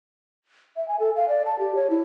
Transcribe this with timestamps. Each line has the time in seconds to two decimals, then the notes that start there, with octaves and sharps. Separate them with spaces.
0.76 E5
0.88 G#5
0.99 A4
1.16 F5
1.28 D5
1.46 A5
1.59 G4
1.75 C#5
1.90 E4